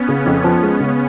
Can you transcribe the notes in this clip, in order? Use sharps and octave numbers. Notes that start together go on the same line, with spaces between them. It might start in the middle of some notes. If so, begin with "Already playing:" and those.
Already playing: B3 C#4
C#3
F2
F3
G#3
C#3